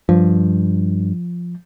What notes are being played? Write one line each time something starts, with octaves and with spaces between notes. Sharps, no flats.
G2 F3